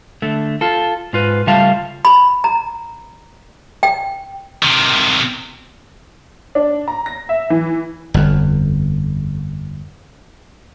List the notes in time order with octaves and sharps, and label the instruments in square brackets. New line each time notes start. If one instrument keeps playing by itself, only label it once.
[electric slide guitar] D3 A3
F4 A4
G#2 F4 B4
C#3 G3 A3 F4 F5 A5
[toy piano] B5
A#5
G5
[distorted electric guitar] C3 D#3
[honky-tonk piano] D4
A#5
A#6
E5
E3
[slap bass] G1 F2